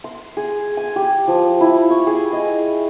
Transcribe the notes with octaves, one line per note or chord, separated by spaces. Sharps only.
C6
G#4
G#5
G4
F3
E4
C#6
G#4
D#5